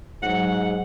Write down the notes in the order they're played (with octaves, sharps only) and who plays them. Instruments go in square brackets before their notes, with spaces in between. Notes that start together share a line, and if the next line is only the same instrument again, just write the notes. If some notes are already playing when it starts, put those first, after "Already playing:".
[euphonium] G#2 [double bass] F#3 [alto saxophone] F#5